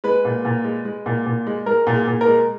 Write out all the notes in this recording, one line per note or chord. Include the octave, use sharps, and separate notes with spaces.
G#3 B4
A#2
A#2
G#3
G#3
A#2
A#2
G#3
G#3 A#4
A#2
G#4
A#2
A#4
G#3